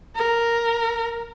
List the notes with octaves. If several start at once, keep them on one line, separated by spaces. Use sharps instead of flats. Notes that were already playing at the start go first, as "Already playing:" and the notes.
A#4